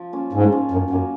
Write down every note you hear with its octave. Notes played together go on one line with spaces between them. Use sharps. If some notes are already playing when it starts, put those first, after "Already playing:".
Already playing: F3
A#3 C#4 F4
G#2 F3
A#3 C#4 F4
F#2 D#3
F#2 F#3 A#3 C#4